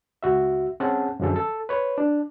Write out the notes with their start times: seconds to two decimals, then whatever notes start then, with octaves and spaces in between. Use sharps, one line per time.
0.23 C#2 F#4 E5
0.80 C4 C#4 G#4 F#5 A5
1.20 F#2 D3 F3 G#4 A4
1.36 A4
1.69 B4 C#5
1.98 D4